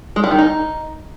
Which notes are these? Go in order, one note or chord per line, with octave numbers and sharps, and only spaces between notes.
G#3
G3
D#3
D#4